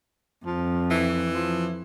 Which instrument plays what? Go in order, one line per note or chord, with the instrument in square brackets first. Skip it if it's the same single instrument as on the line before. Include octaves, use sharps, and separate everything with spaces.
[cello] F2 [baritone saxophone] F3
[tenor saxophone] E3
[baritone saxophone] F3